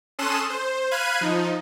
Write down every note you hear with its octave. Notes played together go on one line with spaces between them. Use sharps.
C#4 A4 C6 D#6 F#6 E7
C5
F5 B5 F#6 G#6 D#7
F3 D#4